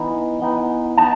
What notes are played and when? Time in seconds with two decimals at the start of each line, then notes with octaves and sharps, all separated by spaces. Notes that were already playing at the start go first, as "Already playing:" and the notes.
Already playing: E3 B3 D#4
0.40 E3 B3 D#4
0.97 B3 D#4 A5